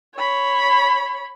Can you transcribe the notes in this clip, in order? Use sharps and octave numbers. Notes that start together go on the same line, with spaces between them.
C#5 B5